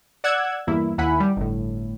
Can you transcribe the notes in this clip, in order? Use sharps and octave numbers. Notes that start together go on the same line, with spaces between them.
D5 F#5 E6 F#6 G#6
E2 G2 A#3 E4
D#2 A#3 E4 F#5 G#5 B5
G3
G1 A2